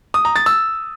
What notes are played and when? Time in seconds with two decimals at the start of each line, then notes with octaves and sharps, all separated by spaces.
0.14 D#6
0.25 A#5
0.36 A6
0.46 E6